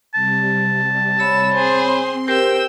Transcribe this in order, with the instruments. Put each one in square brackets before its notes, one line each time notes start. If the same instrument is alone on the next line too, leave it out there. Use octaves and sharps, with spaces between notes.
[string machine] C3 G3 [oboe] A5
[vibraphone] C#5 B5 [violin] E6
[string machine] C4 C6 [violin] G#4 C5
[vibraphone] G4 A#4 C5 [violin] G5 E6